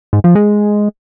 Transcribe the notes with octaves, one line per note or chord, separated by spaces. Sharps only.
G#2
F3
G#3